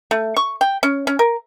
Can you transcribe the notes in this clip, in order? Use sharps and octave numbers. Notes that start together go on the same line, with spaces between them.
A3
C#6
G5
C#4
C#4
A#4